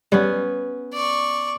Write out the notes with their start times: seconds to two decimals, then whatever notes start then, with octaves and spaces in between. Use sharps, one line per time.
0.12 G3 B3 C#4 B4
0.93 D5 C#6